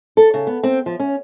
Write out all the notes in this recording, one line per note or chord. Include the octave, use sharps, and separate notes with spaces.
A4
C#3
B3
C4
F3
C#4